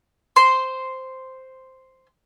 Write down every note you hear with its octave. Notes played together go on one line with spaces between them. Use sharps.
C5 C6